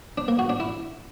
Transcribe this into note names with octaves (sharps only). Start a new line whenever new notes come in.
D4
A#3
F#4
D4
E4